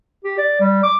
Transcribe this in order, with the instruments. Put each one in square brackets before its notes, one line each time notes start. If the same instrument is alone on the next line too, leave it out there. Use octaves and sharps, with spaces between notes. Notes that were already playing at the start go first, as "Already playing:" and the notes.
[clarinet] G4
D5
G3
D6